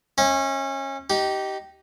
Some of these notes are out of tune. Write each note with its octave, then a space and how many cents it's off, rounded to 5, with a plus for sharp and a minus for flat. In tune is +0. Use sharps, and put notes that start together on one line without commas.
C#4 -25 D#5 +45
D#4 +0 G4 -20